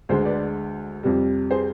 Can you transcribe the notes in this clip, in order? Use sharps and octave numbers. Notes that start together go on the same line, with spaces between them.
D2 D3 G#3 G#4 C5
B4 D5
F2 C3 G3
G#4 C5